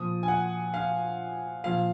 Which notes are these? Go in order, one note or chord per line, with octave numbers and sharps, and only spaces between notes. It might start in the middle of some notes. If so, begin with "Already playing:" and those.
Already playing: A#2 F3 D#6
G#5
F#5
F5
A#2 F3 F5